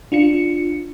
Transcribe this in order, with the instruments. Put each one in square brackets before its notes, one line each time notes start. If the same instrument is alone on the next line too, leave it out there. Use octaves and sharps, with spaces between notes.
[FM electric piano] D4 F4 C#7